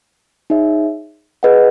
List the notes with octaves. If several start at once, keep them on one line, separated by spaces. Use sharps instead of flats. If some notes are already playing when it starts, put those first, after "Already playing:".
D#4 G#4 C#5 E5
G#4 B4 D#5 F#5